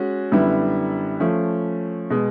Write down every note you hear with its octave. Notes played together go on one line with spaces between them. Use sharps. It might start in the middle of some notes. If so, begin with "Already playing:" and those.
Already playing: G#3 C#4 F#4
F#2 D3 G3 B3 E4
F3 A3 C#4
B2 G#3